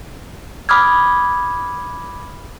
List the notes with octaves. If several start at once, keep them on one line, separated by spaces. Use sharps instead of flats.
B5 D6 D#6 F6 G#6